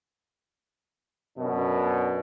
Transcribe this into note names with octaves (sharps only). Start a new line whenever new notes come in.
F#2 B2 D4